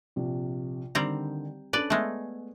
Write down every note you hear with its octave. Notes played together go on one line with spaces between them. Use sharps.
A#1 C3
D3 D#3 G3 C4 A#5
C#4 D4 A4 B4 D5
G#3 A3 B3